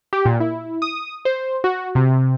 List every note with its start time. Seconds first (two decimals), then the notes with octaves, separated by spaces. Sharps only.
0.13 G4
0.25 A#2
0.40 E4
0.82 D#6
1.25 C5
1.64 F#4
1.95 C3